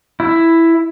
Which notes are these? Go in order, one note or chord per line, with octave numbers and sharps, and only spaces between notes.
E4